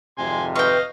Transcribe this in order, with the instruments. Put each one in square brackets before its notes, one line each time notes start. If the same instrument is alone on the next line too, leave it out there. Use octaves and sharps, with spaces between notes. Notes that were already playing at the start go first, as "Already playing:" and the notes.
[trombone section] G#1 F2 C3 [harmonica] G#5 C6
[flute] B4 [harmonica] D#5 F5 [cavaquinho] G5 C#6